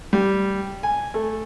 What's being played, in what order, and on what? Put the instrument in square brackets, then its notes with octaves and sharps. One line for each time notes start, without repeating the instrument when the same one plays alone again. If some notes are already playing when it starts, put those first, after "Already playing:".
[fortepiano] G3
G#5
A3